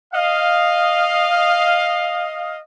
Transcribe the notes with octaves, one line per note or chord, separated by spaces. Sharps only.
D#5 F5